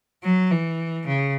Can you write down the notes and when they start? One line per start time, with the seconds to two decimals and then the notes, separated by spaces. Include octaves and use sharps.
0.23 F#3
0.51 E3
1.07 C#3